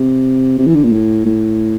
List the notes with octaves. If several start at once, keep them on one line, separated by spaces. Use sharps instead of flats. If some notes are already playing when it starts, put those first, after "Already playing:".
Already playing: C3
C3
E3
D3
A#2
A2
A2